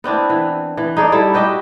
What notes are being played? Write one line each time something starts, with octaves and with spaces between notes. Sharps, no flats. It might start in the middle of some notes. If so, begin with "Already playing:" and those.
B3 C4 D4 E4
E3
E3
D#4 G#4 A4 D5
G3 E4 A4
F#4 G4 D#5 E5